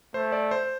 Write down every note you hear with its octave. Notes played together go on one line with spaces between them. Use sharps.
A3 C5
D5
C5